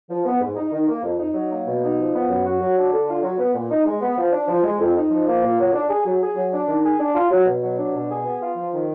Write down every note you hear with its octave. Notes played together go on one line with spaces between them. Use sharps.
F3
B3
G#2
D#4
D#3
A#3
F2
D#4
F#3
A#3
B2
D#4
F3
B3
F#2
F#4
F#3
D4
D3
F4
F#3
B3
A#2
D#4
G#3
B3
F3
D4
F3
G#3
F2
D#4
F3
A#3
A#2
F#3
D4
G#4
F#3
G#4
F#3
D4
D#3
G#4
D4
F4
F#3
B2
F#3
D4
B2
G#4
B3
F4
F3
D#3